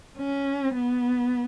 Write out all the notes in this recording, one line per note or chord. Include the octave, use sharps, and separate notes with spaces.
C#4
B3